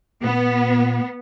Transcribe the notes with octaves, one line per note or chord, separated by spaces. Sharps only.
A#2 B3